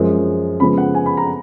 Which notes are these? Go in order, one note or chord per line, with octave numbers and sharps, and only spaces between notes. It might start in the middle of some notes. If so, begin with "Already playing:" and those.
Already playing: F#2 F3 G#3
C#3 F3 G#3 B3 B5
F#5
G#5
B5
A#5